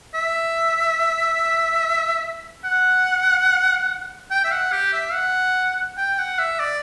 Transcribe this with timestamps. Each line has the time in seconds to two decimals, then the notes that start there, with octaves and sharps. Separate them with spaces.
0.15 E5
2.64 F#5
4.31 G5
4.45 E5
4.52 F#5
4.73 G4
4.93 E5
5.14 F#5
5.98 G5
6.19 F#5
6.39 E5
6.60 D5